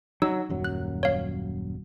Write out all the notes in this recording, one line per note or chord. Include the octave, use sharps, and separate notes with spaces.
F#3 D#4 E6
D#1 F#2 F#3
F#6
C#5 F5